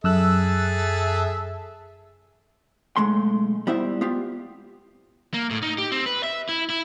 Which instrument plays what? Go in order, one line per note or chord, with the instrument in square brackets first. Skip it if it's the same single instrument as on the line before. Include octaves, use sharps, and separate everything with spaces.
[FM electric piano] F#2 E6 F#6 [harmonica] G#4 A4 E5
[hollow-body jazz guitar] B1 G#3 A3 C6
G3 B3 E4 C5 E5
B3 F4 G4
[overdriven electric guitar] A#3
A2
D#4
G4
C4
B4
E5
E4
E4